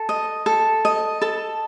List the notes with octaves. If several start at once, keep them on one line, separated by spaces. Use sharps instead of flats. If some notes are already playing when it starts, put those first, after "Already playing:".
Already playing: A4
D#5
A4
D#5
A4 A5